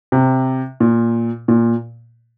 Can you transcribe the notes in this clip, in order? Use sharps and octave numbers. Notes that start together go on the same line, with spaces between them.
C3
A#2
A#2